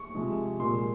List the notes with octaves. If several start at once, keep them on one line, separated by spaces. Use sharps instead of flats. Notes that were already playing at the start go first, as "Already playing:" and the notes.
Already playing: C#6
C3 F3 G#3
A#2 F3 G#3 C6